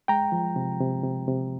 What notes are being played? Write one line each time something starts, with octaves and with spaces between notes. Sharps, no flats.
G#3 G5 A#5
F3
C3
C3
C3
C3